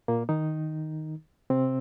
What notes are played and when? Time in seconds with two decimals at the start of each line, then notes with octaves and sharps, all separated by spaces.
0.08 A#2 A#3
0.29 D#3 D#4
1.50 C3 C4